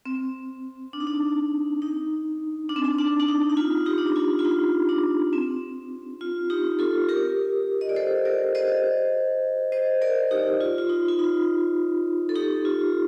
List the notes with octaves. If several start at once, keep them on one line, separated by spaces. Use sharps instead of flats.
C4
D4
D#4
D4
D#4
D4
C4
D4
D4
D4
D#4
D#4
F4
D#4 G4
D4
D#4
F4
F4
D#4
D4
C4
F4
D#4 G4
F4 A4
G4 A#4
D#5
D5
A4 C5
A#4 D5
C5 D#5
C5 D#5
A#4 D5
D#4 G4
F4
F4
D#4
F4
D#4
A4
D#4 G4
F4